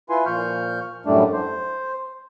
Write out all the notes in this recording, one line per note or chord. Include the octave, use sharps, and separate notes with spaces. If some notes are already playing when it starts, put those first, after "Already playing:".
E4 F4 B4 G#5 C6
A#2 F3 C#6 F6 G6
F#2 A2 G3 A3 D4
C5